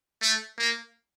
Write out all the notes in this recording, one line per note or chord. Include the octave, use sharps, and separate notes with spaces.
A3
A#3